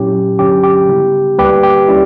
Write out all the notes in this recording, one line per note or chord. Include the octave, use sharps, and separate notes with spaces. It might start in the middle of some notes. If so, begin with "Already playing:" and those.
Already playing: A#2 F#3 C#4 E4 G4
G2 D3 F#3 C#4 G4
G4
C#3 G3 B3 E4
D2 D3 G3 A#3 G4 B4
G4
G3 C#4 E4